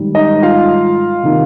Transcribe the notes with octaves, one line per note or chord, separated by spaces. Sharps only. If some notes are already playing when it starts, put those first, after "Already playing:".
Already playing: G#2 D#3 G3
D#4 D#5
F4 F5
C3 D#3 A#3